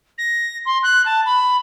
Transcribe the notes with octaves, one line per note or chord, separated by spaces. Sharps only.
A#6
C6
F#6
A5
B5